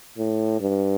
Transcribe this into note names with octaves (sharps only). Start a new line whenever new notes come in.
A2
G2